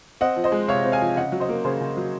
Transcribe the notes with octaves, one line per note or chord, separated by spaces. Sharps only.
C4 D#5 F#5
F3
C5 D#5
G#3
C3 C#5 F5
C4
F5 G#5
F3
C#3 D#5 F#5
F#3
C5 D#5
A#3
C#3 G#4 C5
C#3
F#3